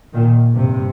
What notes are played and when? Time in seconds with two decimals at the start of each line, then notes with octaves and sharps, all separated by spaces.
0.12 A#2 D#3
0.55 G2 C3